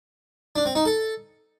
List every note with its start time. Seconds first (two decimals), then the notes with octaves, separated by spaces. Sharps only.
0.56 D4
0.66 C4
0.75 D#4
0.85 A4